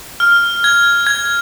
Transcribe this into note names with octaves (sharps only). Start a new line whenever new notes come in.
F6
G#6
G#6